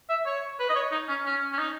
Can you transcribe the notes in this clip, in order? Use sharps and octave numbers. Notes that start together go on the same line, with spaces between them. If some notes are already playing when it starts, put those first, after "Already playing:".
E5
C#5
B4
D#5
C#5
D#4
C#4
C#4
C#4
D#4